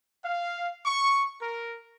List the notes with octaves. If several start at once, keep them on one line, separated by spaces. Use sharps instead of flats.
F5
C#6
A#4